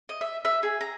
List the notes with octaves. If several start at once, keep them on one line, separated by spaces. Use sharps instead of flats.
D#5
E5
E5
G#4
A#5